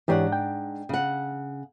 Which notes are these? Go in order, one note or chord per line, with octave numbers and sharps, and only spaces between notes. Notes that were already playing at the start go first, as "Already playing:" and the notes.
G#2 E3 D4 G4 C#5 F#5
G5
C#3 F#5